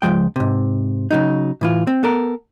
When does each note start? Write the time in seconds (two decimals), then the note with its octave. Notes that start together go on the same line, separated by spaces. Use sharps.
0.02 C#2 G#2 F3 G#3 G5
0.36 G#2 C3
1.11 C#3 F#3 D#4
1.61 A2 E3 F4
1.87 C4
2.03 B3 A4 A#4